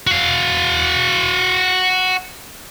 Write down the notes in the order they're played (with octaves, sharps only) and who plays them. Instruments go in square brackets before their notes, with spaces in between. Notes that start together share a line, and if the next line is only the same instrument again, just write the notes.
[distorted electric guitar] F#4 F5